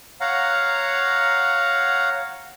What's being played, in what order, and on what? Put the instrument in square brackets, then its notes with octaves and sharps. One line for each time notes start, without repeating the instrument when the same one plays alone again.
[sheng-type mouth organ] C#5 F5 F#5 A#5